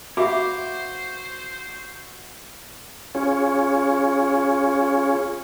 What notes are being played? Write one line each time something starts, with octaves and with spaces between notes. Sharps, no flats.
F#4 C5 E5 F5 B5 D6
C#4 F4 G#4 C#5